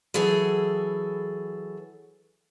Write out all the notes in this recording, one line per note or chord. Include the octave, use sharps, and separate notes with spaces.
E3 F#3 G#4 A4